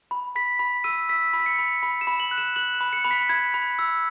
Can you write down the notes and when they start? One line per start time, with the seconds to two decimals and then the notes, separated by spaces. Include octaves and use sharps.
0.11 B5
0.35 B5 B6
0.59 B5
0.84 E6 D#7
1.09 E6 B6
1.33 B5
1.40 B6
1.46 C#7
1.59 B5
1.83 B5
2.01 E7
2.07 B5
2.20 F#7
2.31 F#6
2.38 E7
2.56 F#6 F#7
2.75 E7
2.81 B5
2.93 C#7
3.05 B5
3.11 B6
3.29 B5 G#6
3.54 B5
3.79 E6